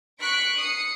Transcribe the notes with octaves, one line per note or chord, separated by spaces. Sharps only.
C#6 F#6 B6 D7
D#6 C7 C#7